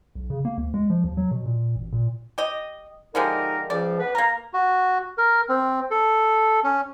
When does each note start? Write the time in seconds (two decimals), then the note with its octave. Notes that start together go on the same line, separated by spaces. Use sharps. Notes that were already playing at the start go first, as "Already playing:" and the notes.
0.15 B1
0.30 C#3
0.45 A#3
0.58 D2
0.74 G#3
0.90 F3
1.04 D#2
1.17 F#3
1.31 B2
1.46 A#2
1.76 A1
1.93 A#2
2.38 G4 D#5
3.15 D3 F3 G#3 D#4 G4 A#4
3.70 C#2 F3 D5
4.00 B3 B4
4.15 A#3 A#4 A#5
4.53 F#4
5.18 A#4
5.49 C4
5.91 A4
6.64 C#4